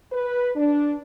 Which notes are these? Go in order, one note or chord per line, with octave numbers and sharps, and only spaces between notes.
B4
D4